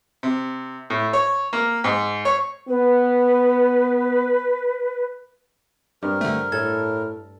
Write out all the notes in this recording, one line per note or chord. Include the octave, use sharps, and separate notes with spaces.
C3
A2
C#5
A#3
G#2
C#5
B3 B4
G2 C4 A#4
D3 A3
A2 A4 G#6